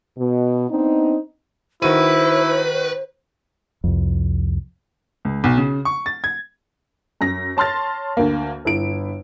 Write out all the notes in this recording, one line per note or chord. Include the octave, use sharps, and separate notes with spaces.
B2
B3 C4 D4 D#4
D#3 E4 F#4 B4 C5 D#7
C2 F2
C#2
B1
C#3
C#6
A6
G#6
F#2 A#6
C#5 A5 C6 F6 A6
D2 A#3
G1 E4 D7